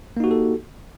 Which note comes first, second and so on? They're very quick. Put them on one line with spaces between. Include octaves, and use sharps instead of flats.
A#3 D#4 F#4 G4 A4